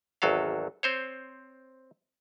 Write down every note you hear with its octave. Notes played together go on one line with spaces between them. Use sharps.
G#1 E2 F#3 A4 F5
C4 C5 C#5